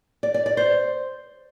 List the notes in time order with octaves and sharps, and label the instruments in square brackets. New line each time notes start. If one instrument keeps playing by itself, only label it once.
[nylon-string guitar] D5
D5
D5
C5